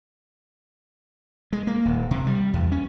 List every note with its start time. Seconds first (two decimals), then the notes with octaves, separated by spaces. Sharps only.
1.53 G#3
1.67 A#3
1.85 D#1
2.11 C3
2.27 G3
2.53 E2
2.72 C#4